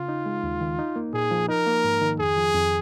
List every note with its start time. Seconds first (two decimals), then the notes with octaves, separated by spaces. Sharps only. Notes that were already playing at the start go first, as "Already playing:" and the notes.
Already playing: C#3 F4
0.09 D#4
0.26 G#3
0.43 D#2
0.61 D#3
0.79 D#4
0.96 A#3
1.14 A#2 G#4
1.31 F3
1.49 D#4 A#4
1.67 A#3
1.84 G#2
2.02 D#3
2.19 F2 G#4
2.37 F3
2.54 F2